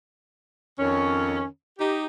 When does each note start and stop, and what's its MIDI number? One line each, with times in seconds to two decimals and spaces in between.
0.79 1.44 41
0.79 1.44 51
0.79 1.44 61
1.79 2.05 63
1.79 2.05 67